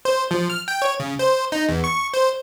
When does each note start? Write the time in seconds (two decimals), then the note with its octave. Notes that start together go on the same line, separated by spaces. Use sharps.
0.05 C5
0.31 F3
0.50 F6
0.68 G5
0.82 C#5
1.00 C#3
1.19 C5
1.52 D#4
1.69 E2
1.84 C#6
2.14 C5